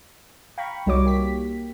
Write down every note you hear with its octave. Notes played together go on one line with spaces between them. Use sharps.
F5 G5 A#5 B5 C#6
C2 G3 D#4 F#4 C#5 D6
A#3 G4 B6